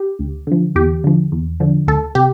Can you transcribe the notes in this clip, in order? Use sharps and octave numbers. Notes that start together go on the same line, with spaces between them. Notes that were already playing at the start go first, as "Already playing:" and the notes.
Already playing: G4
D2
D3 F3
E2 G4
D3 F3
E2
D3 F3
D2 A4
C3 G4